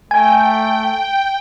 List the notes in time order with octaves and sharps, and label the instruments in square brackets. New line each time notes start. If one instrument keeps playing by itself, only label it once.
[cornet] A3 [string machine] G5 [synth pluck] G#5